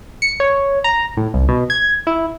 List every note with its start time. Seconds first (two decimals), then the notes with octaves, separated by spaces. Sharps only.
0.22 C#7
0.40 C#5
0.84 A#5
1.17 A2
1.34 C2
1.49 B2
1.70 G#6
2.07 E4